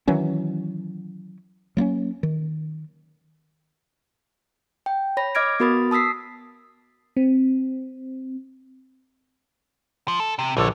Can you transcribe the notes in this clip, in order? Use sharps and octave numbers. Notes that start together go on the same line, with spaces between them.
D#3 E3 F#3 C#4
F#3 A#3 B3 C#4
D#3
G5
C#5 B5 A#6
D#5 D6 F6 G#6 A#6 D7
B3 F#4 A#4 B5 D#6 A6
A5 D#6 E6 B6 C7
C4
F3
A4
C3
A#1 D3 E3 A4 C#5